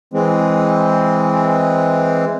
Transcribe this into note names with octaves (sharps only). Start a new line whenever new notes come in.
E3 G#3 C4